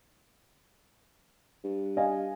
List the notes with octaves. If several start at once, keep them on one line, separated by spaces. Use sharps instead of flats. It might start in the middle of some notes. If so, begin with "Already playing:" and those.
G2
D#5 F5 G#5